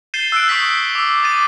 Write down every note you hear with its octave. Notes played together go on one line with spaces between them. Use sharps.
G6 A6 C7 D#7 E7 G7
E6 F#6 G6 C7 D7
C#6 D#6 E6 B6 F#7
D6 E6
D6 A6 D#7